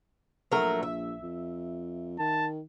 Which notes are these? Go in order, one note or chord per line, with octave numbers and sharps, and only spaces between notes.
A#1 F#3 A3 A#4
E5
F2
D#3 A5